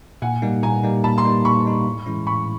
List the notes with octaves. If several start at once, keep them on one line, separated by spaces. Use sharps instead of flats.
A#2 F#5 G#5
G3 A#3 D#4
A#2 G#5 A#5
G3 A#3 D#4
A#2 A5 B5
A#5 C6
G3 A#3 D#4
A#2 B5 C#6
G3 A#3 D#4
A2
E3 G#3 C#4 E4
A2 B5 C#6